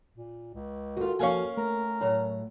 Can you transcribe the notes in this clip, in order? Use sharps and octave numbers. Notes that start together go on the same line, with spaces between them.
A#2
C#2
D#3 F4 F#4 A4
F3 A#3 C#4 F5 G#5
A3 A#4
A2 F#3 A#5